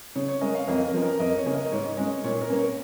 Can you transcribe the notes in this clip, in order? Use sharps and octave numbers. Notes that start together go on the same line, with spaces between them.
C#3 C#5
C#5
G#3 C#4 A#4 D#5
C#5 F5
F2 A#4 D#5
A#4
F3 C#4
A#4
F2 A#4 D#5
C#5
C#3 A#3 C#4
A#4 D#5
G#2 C#5
G#3 C#4
A#2 C#5
A#4
A#3 C#4
C#5